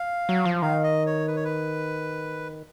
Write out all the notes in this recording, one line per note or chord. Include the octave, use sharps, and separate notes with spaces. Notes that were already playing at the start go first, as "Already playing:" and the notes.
Already playing: F5
F#3
F3
D#3 F5
D#5
C#5
B4
C#5
B4